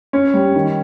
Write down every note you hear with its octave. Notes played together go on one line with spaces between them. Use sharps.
C#4
G3
D#3